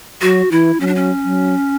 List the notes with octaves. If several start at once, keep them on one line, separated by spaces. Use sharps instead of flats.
F#3 F#4
E3 E4
F#3 C#4
D4
C#4
F#3